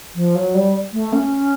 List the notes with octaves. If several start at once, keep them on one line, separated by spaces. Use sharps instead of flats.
F3
F#3
G3
A3
C#4